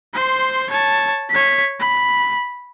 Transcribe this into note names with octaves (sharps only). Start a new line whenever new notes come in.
C5 C6
C#5 A5
C#5 B6
B5